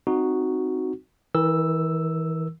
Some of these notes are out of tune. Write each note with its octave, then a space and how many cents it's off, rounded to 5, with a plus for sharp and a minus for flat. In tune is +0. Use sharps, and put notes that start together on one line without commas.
C4 +0 D#4 -5 F#4 +0
E3 -30 A#4 +0 E6 +0